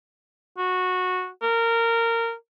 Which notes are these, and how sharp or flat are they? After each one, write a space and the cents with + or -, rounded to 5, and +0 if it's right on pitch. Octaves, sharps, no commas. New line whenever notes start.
F#4 -15
A#4 -20